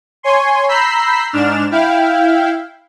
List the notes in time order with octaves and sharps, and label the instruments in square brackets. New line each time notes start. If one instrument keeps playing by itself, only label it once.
[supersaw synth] C#5 G#5 C6
A#5 B5 E6 G6 B6 C7
G#2 D4 F6 E7
E4 F5 G5